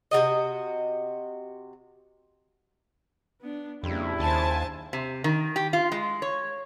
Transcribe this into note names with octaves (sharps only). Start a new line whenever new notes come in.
C3 G3 F#4 D#5
B3 D4
F2 C#3 G3 A#3 D4 E4
D#2 C5 G#5 A5
C3
D#3
G4
F4
G#3
C#5